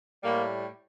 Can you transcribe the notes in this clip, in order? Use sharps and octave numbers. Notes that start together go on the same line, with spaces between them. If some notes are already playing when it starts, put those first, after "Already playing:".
A2 G3 A#3